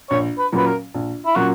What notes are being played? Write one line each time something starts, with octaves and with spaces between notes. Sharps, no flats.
A#1 C#5
B4
A#2 F#3 C#4 B4
A#4
A#1
E4
A#2 F#3 C#4 F#4